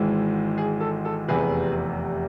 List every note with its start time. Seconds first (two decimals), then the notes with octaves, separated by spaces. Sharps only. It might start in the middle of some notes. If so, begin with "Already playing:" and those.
Already playing: G#1 G#2 E3 G#3
0.58 G#4
0.80 A4
1.05 A4
1.28 F1 E2 C3 G#4 B4